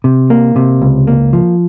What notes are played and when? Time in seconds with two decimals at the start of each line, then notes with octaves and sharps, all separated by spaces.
0.04 C3
0.30 A#3
0.56 C3
0.82 C#2
1.07 A#3
1.33 F3